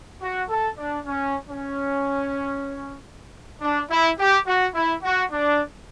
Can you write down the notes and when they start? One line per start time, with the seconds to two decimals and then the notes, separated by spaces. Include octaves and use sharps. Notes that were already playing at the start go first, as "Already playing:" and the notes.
0.21 F#4
0.49 A4
0.78 D4
1.06 C#4
1.48 C#4
3.61 D4
3.90 E4
4.18 G4
4.47 F#4
4.75 E4
5.03 F#4
5.31 D4